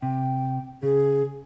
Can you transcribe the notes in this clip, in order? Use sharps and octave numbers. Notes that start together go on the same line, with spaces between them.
C3 G5
C#3 G#4